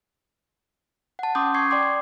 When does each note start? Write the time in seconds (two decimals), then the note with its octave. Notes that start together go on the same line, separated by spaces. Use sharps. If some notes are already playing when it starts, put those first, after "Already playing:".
1.19 F#5 A5
1.35 C#4 C6 D6 D#6 G6
1.54 C#6 G#6 C7
1.71 D5 G5 C6 D6